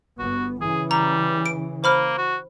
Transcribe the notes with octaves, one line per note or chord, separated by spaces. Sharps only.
G1 B3 F#4
C#3 E3 G#4
G3 A#5
D7
A#3 C5 B5 F6
F#4